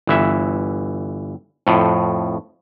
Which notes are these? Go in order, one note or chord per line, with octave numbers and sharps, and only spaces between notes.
G1 E3 E5
F2 A2